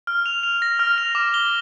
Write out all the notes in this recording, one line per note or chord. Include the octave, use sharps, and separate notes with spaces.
F6
F7
F7
A#6
F6
F7
D6
G7